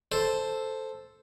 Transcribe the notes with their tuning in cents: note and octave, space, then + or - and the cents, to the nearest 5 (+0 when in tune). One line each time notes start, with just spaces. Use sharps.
A4 +0 C5 +0